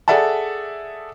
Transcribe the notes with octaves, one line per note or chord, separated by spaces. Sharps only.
G#4 A4 D5 E5 F#5 A5